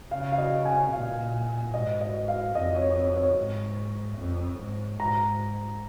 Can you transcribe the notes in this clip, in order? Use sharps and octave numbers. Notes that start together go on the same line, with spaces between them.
C#3 F5
F5
D#5
G#5
A#2 F5
G#2 D#5
D#5
F5
F2 D#5
C#5
C#5
C#5
G#2
F2
G#2
G#2 A#5